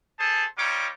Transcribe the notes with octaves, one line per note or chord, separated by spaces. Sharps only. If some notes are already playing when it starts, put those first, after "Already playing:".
G#4 A4 C5 A5
G3 D#4 F4 C#5 D6